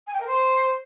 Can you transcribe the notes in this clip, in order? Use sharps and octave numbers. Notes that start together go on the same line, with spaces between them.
G#5
G5
A#4
C5